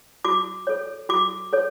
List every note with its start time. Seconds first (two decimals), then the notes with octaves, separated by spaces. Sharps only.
0.25 F#4 D6
0.67 A4 C#5
1.09 F#4 D6
1.53 A4 C#5